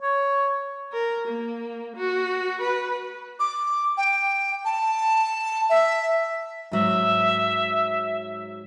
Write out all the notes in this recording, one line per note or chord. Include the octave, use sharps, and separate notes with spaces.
C#5
A#4
A#3
F#4
B4
D6
G5
A5
E5
G#2 F#3 E5